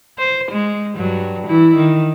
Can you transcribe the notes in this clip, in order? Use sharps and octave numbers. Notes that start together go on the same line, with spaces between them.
C5
G#3
G2 F#3
E3 E4
D#3